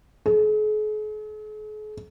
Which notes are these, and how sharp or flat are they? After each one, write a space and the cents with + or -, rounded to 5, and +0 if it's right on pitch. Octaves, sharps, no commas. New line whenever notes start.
G#4 +45